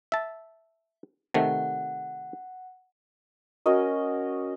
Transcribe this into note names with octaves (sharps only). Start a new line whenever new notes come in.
E5 A5
C3 D#3 A3 F#5
C#4 F#4 A#4 D#5